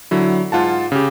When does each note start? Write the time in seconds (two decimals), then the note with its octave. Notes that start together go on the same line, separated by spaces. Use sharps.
0.11 D3 F#3 E4
0.52 G#2 F4 F#5 A5
0.92 C#3 G4